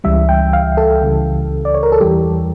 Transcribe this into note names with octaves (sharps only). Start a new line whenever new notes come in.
C#2 C#3 E3 G3 E5
G5
F5
A4
C#2 C#3 E3 G3
D5
C#5
A#4
A4
E2 E3 G3 G4